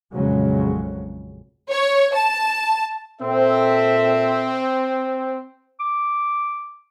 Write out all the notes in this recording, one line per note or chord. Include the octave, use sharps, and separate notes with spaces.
A#1 F2 C#3 F#3 G#3
C#5
A5
A#2 C4 A4 E5
D6